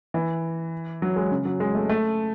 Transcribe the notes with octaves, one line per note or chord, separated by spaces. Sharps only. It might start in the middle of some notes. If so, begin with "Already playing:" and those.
E3
F#3
G#3
C#3
F#3
G#3
A3
A3